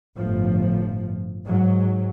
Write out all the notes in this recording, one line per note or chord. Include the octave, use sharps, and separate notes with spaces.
G1 A2 F3
G#2 F#3